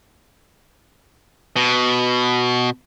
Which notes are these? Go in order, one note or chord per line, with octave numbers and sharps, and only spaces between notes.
B2